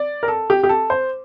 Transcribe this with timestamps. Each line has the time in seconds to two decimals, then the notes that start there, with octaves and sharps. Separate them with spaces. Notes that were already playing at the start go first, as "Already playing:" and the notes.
Already playing: D5
0.23 A#4
0.28 A4
0.50 G4
0.64 G4
0.69 A4
0.90 C5